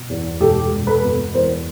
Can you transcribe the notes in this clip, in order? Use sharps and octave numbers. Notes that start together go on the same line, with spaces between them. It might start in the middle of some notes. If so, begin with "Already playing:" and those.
Already playing: B2
E2
E1 G4 A4
E1
A4 B4
B2
E2 A#4 C5